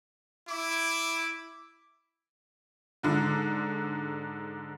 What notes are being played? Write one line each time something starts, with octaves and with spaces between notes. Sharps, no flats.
E4 D6
G#2 D3